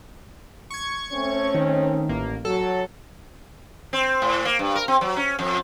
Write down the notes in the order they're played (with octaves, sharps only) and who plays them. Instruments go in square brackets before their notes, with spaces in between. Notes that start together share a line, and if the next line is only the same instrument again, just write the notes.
[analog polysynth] C#6 G#6
[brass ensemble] A3 C4 C#4
[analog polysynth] D#3
A1 A#3
[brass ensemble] F#3 [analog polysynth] A4
[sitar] C4
A2
A#3
G2
A#4
C4
F#3
C#4
F2